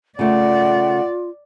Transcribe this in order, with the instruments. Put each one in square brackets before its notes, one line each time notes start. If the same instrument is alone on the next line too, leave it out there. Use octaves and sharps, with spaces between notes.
[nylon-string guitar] C#3 A3 [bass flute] F4 [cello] D5 [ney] F#5